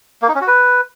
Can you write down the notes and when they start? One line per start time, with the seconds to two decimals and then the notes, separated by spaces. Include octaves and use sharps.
0.22 A#3
0.28 D#4
0.35 C#4
0.41 F#4
0.48 B4